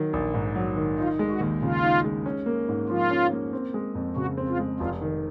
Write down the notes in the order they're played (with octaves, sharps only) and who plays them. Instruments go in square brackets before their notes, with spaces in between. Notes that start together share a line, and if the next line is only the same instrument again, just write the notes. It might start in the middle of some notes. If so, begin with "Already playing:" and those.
Already playing: [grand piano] D#3 F#3
A#1
G#2
F#3
D#3
[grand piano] D#4 [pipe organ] F4
[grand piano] G#3
[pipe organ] F#4
[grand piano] D#2
[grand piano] C#3 [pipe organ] F4
[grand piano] D#4
G#3
C#4
A#3
G#2
[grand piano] F3 [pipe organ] F4
[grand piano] C#4
A#3
C4
G#3
F2
[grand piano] C#3 [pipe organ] F#4
[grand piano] C4
[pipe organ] F4
[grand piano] G#3
[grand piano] F1 [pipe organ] F4
[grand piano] D#3